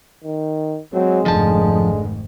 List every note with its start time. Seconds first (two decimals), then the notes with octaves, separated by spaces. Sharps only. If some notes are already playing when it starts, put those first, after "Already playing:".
0.24 D#3
0.94 F#3 G#3 C4
1.26 F1 G#2 D3 D#3 F3 A5